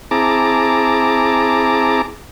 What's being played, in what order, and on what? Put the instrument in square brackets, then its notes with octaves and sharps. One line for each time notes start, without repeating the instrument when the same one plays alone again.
[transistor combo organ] C4 E4 G#4 A5 A#5 D6